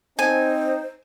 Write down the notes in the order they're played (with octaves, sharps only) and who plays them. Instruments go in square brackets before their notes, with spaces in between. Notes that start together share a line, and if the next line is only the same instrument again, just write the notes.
[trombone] C4 [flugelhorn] D#4 [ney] C5 [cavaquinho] G#5